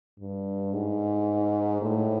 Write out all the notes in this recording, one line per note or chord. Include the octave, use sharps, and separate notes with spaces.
G2
G#2
A2